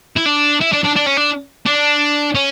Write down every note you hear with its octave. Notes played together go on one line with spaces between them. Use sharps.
E4
D4
E4
D4
D4
D4
C#4
D4
D4
C#4